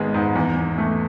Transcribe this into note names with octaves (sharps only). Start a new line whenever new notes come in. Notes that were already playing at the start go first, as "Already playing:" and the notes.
Already playing: G#1 G#3 B3
G#2
E2
E2
A3